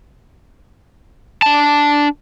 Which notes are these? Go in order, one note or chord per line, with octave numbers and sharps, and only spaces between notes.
D4 A5